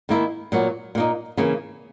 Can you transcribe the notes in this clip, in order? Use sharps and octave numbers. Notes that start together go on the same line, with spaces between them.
D#3 A#3 E4
A#2 F#3 B3
A#2 A#3 D#4
C#3 E3 A#3 C#4